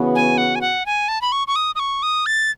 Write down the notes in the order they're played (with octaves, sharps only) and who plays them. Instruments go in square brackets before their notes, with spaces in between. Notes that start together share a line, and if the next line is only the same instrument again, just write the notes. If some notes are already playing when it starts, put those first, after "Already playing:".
Already playing: [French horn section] C#3 E3 B3 F#4
[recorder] G#5
F#5
G#5
F#5
G#5
A5
B5
C#6
C#6
D#6
D#6
C#6
D#6
A6